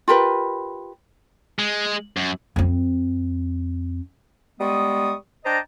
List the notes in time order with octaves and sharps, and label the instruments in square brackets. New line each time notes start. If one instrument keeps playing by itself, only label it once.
[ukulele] F4 G4 A#4 B4
[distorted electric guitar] G#3
F#2
[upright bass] F2 C4
[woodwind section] G3 G#3 B3 C#6 D#6
D4 C5 D#5 G5 A5 A#5